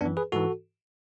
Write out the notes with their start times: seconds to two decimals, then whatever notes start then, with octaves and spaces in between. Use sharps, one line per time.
0.01 F#2 E3 B3 D4
0.17 G#4 B4
0.32 G#2 E3 F#4 A4